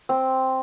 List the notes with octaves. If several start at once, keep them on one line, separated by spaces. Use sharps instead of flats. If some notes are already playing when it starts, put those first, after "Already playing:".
C4